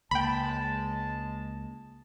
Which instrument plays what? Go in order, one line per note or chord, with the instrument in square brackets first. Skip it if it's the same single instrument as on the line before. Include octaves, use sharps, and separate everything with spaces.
[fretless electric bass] C#2 A#3 [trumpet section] G#3 A5 [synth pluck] G5 B5